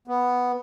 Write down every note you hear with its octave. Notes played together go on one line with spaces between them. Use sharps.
B3